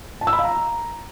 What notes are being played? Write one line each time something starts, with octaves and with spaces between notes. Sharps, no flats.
A5
E6
B5
F5
A#5